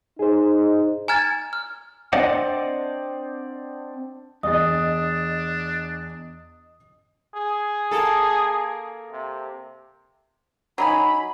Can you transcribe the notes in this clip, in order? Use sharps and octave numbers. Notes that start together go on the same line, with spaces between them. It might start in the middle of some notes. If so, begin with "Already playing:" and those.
D#4 G#4 C5
G#5 A#5 F6 G#6 A6
F6
C4 D4 C5 D5 D#5 F#5
E2 D4 D#5 D#6 A6
G#4
A#3 A4
C3
F#3 D#4 G#5 B5